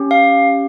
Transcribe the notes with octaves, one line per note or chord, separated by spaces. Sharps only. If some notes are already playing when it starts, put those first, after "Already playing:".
Already playing: C#4 G4
F5